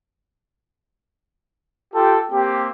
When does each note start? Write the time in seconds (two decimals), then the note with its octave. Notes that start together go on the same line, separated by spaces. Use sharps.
1.94 F4 G4 A4 G5
2.32 A#3 C4 G4